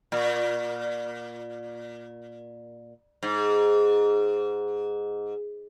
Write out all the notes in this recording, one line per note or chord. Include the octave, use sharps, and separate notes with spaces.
A#2
G#2